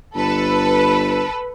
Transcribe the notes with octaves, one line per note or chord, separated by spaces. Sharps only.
G1 A4 B4